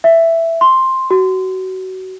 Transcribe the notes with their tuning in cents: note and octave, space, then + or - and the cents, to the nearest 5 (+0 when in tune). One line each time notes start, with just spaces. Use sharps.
E5 +5
C6 +5
F#4 +25